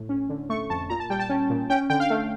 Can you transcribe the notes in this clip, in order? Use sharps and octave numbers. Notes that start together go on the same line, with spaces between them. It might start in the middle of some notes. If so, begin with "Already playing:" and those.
Already playing: A2
C#4
D3
A3 C#6
F2 A5
A#2 A#5
A5
G3 G5
A5
C#4
A#2
C#4 G5
D3 G5
F5
A3